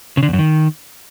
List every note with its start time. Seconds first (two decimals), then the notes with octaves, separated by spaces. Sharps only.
0.17 C#3
0.23 D3
0.28 E2
0.33 F#2
0.39 D#3